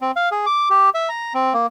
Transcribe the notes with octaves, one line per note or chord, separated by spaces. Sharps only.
C4
F5
G#4
D6
G4
E5
A#5
C4
A#3